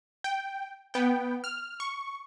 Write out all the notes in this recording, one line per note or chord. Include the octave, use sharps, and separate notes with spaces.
G5
B3 G5
F6
C#6